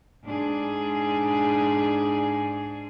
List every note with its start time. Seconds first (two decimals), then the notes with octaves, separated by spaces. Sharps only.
0.24 G#2 D4 G#4